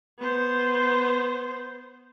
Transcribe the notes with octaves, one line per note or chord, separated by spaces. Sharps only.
B3 C5